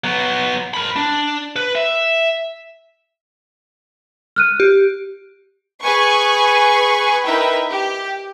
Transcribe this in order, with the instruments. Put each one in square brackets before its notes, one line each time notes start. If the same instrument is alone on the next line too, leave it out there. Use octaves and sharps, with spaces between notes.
[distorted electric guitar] F#3 B3
A#4 B5
D4
B4
E5
[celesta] F6 F#6 D#7
[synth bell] G4
[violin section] G#4 B4 G#5 C#6
D#4 E4 A#4 B4 E5 G5
G4